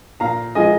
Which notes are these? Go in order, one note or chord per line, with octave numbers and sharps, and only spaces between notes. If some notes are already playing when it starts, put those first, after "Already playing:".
A#2 F5 A#5
G#3 F4 D#5 G#5